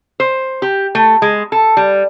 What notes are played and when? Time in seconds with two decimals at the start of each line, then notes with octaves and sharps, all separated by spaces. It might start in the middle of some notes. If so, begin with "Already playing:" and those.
0.20 C5
0.62 G4
0.95 A3
1.22 G#3
1.52 A4
1.77 G3